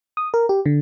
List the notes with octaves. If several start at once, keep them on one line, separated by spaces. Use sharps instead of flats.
D#6
A#4
G4
D3